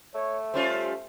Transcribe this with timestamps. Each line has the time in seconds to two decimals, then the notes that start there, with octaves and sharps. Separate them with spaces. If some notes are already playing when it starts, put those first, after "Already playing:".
0.15 A3 C#5
0.54 G3 C#4 F4 C5